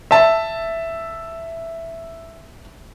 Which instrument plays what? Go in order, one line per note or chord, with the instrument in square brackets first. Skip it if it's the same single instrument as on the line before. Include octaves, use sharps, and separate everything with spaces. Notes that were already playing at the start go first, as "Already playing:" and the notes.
[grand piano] E5 A5